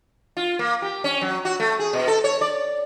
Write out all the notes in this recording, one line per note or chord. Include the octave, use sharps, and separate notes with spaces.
F4
A#3
G4
C#4
F#3
F#4
A3
G#4
B2
A4
C#5
D5